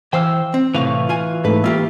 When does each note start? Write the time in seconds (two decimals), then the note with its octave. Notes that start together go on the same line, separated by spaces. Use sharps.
0.13 E3 C5 F5 G5 E6
0.54 C4
0.75 A2 C3 E3 F5 C#6
1.09 F4 G#5
1.45 G#2 A3 B4
1.64 A#3 F4 G4 E5